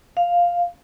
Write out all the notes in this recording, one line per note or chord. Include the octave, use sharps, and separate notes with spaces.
F5